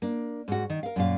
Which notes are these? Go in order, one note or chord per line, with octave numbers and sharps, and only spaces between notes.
A#3 D4
G#2 F#4
D#3
A#4 F5
F#2 A#2 F5